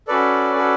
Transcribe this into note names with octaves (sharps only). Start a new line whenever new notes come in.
C#4 F#4 A4 B4 D5
C#4 F#4 A4